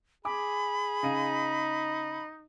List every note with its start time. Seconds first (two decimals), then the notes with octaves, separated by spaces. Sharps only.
0.25 G#4 G#5 B5 D6
1.03 C#3 D#4 F5 D#7